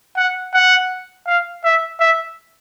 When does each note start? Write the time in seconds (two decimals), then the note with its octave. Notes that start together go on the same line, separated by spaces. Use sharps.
0.17 F#5
0.54 F#5
1.27 F5
1.64 E5
2.00 E5